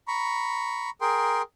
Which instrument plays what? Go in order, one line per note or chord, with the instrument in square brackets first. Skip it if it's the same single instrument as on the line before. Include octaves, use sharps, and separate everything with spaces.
[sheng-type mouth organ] A#5 B5 C#6
G#4 A#4 G5 C6